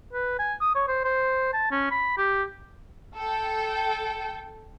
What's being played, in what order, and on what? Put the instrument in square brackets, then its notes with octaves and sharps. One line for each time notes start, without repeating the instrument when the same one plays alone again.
[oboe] B4
G#5
D#6
C#5
C5
C5
A5
C#4
B5
G4
[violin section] A4 G5